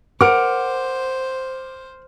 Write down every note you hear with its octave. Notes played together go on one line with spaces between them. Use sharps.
A#4 C5 F#5 D6 F6 D7